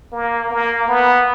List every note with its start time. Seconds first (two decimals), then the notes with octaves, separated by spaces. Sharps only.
0.12 A#3
0.51 A#3
0.88 B3